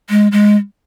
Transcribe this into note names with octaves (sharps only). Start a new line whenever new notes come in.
G#3
G#3